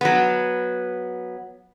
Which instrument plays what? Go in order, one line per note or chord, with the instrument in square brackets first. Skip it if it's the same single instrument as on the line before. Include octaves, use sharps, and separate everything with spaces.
[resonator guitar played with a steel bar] F#3 B3